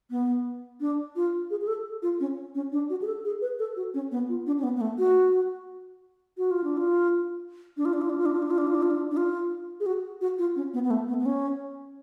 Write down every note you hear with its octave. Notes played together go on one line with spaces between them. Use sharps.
B3
D4
F4
G#4
G#4
A4
F4
C#4
C#4
D4
F#4
G#4
A4
G#4
B4
A4
F#4
C#4
B3
F4
D4
C#4
B3
B3
A3
F#4
F#4
F4
D4
F4
D4
F4
D4
F4
D4
F4
D4
F4
D4
F4
D4
F4
D4
F4
D4
D4
F4
G#4
F#4
F#4
F4
C#4
B3
B3
A3
B3
B3
C#4